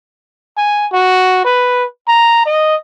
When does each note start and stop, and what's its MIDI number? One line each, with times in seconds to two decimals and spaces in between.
0.57 0.87 80
0.92 1.40 66
1.45 1.84 71
2.08 2.44 82
2.46 2.76 75